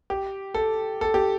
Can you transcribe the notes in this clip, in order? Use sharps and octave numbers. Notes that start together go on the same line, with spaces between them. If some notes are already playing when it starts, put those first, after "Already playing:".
G4
A4
A4
G4